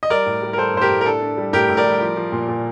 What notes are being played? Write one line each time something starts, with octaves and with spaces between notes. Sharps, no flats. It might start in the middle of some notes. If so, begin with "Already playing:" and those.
D#5
G3 A#4 D5
A2
G3
A#4
G3 A4 C5
A2 C5
G4 A#4
A2
A#4
D4 A4
D4
G3
A2 G4 A#4
A2
A#4 D5
G3
F3
F3
A#2
A#2